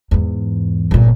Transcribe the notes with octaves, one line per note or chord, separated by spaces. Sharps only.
E2 G#2
G1 A#2